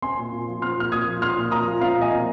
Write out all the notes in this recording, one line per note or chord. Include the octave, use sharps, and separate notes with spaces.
C4 G#5 C6
A#2
A#2
F3
C4 C6 F6
A#2 F6
A#2 D#6 G#6
F3
C4 C6 F6
A#2
A#2 A#5 D#6
F3
C4 F5 A#5
A#2
D#5 G#5
A#2